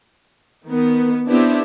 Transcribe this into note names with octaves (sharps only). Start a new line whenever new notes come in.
D#3 B3
B3 C4 D4 E4 G4